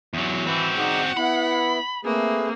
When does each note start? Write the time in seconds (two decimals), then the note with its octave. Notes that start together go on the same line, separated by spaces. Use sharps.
0.14 E2 F#3
0.46 E3 C4 F#4
0.77 D#4 G#4 D5 F#5
1.17 B3 E4 B5
2.05 A3 A#3 C4 G#4 B4